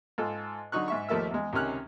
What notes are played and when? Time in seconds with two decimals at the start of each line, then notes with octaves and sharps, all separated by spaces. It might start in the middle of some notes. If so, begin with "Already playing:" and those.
0.18 G#2 F4 A4
0.72 D3 F#3 D#4 C#6 F#6
0.88 G#2 E5 C#6
1.09 D#2 F3 A3 A#3 E5 E6
1.31 E2 G#3
1.53 C#2 C3 D#3 C#4 F6 F#6